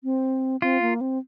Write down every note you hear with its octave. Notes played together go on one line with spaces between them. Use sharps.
C4
C4 F4
A#3
C4